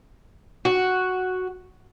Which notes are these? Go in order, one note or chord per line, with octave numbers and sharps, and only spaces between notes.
F#4